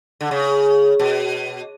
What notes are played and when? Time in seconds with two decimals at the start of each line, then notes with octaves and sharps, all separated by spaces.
0.21 D3
0.31 C#3
0.99 B2